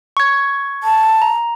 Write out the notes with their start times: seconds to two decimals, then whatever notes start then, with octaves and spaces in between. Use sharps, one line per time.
0.17 C#6 G#6
0.83 A5
1.22 A#5